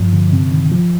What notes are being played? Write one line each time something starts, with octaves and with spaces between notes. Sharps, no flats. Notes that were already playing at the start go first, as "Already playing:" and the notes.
Already playing: G2 F3
D3
C3
D#3
F3